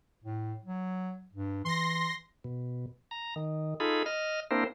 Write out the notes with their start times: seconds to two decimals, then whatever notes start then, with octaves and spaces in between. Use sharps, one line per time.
0.24 A2
0.65 F#3
1.34 G2
1.65 E3 C6 A#6
2.44 B2
3.11 A#5
3.36 D#3
3.80 D#4 F4 G#4 A4 B5
4.06 D#5 F6
4.51 A#3 C4 D4 E4 A#4 C5